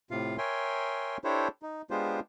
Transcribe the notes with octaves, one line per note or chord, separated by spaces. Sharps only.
A2 C3 F4 F5
A#4 C#5 E5 G5 G#5 C6
D4 E4 G4 A4 C5 C#5
D#4
G#3 B3 D4 F4 G4 C5